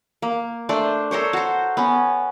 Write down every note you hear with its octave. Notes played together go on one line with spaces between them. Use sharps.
A#3
A3 D4 C5 D5
A4 A#4 C5 C#5
F#4 C5
B3 C#4